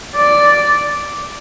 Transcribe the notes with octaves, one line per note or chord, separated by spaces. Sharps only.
D5